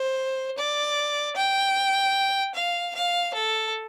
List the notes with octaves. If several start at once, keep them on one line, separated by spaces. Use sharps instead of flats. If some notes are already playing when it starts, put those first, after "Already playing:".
Already playing: C5
D5
G5
F5
F5
A4